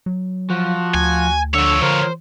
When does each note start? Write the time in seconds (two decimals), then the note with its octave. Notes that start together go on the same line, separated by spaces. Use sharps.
0.06 F#3
0.50 F3 F#4
0.94 D2 G#5
1.54 D3 F3 C#5 E6
1.82 D3 A#4 C5